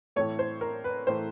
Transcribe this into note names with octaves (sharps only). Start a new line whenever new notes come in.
A2 E3 A3 C#5
C5
A#4
B4
A2 E3 A3 C5